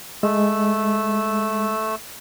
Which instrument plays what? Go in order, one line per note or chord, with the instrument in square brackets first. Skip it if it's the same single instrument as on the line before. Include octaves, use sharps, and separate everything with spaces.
[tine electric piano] G#3 [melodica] A3 E6